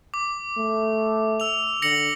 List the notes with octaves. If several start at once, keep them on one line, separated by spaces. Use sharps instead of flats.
D6
A3
E6 F7
D3 A#6 C#7 F#7